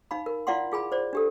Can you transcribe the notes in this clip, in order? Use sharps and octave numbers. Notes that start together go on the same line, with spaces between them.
D#4 F5 B5
A#4
E4 F4 D5 F5 F#5 C6
F4 G#4 G#5 B5
C5 D5
D4 G4 A4